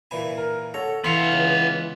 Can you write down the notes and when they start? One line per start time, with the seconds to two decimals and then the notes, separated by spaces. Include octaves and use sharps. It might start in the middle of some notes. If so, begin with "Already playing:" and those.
0.11 A#2 E3 G#5 B5
0.37 A#4
0.74 A4 C#5 F#5 A#5
1.04 E3 B3 F5 B5 C6 C#7
1.32 C#2